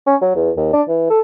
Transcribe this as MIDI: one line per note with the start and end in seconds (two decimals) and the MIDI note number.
0.07 0.16 61
0.22 0.31 54
0.35 0.51 40
0.57 0.71 39
0.73 0.82 62
0.88 1.08 52
1.10 1.21 69